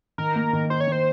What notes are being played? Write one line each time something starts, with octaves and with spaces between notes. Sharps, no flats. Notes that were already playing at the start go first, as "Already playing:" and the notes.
D#3 A#4
A#3
D#3
D#4 C5
C#5
D#3 C5